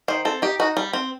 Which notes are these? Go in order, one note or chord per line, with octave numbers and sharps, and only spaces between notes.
D#3 C5
C4 A4
D#4 G4
D#4 F#4
G3
C4